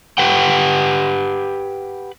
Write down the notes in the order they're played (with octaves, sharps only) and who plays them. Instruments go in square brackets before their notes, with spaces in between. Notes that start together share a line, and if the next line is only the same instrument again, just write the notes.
[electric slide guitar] G4 B4 F#5 G5